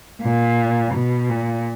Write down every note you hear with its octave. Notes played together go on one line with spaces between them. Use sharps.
A#2
B2
A#2